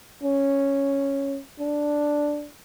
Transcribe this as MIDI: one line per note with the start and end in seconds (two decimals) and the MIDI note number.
0.23 1.39 61
1.60 2.48 62